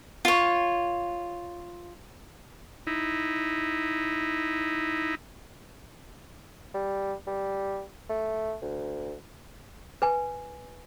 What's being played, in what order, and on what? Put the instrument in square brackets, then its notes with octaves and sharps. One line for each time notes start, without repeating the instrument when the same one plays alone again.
[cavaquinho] F4 C#5
[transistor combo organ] D#4 E4
[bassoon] G3
G3
A3
D2
[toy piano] B4 G#5